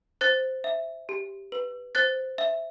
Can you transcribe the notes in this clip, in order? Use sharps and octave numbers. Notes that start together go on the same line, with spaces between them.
C5 F#6 A6
E5
G4
B4
C5 F#6 A6
E5